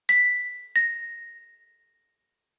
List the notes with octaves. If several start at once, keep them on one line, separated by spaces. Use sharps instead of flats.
B6
A#6